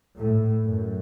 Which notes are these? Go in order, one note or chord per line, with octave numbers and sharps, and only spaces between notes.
A2
F#2